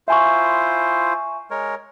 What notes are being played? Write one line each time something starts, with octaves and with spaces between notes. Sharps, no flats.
E4 F4 C5 E5 G#5 C#6
G#3 A#4 C#5